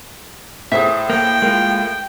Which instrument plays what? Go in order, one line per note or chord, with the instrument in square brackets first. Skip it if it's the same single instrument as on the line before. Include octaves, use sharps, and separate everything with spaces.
[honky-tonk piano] A2 [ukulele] G#4 C5 E5
[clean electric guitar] A#3 [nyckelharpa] G5
[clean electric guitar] G#3 A#3 F4